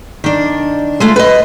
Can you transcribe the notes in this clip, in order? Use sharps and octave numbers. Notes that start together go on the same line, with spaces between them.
D#3 D4
G#3 A3 F4
B4 D#5